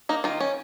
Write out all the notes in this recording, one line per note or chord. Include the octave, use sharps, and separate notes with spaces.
A#3 D#4
D#3 F4
C#4